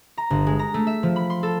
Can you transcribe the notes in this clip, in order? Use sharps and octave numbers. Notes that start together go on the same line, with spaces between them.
A#5
G1
G#3
A#5
A3
E5
F3
B5
C6
A4